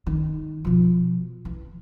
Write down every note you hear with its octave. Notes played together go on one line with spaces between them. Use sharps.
D#3
B2 F3
E3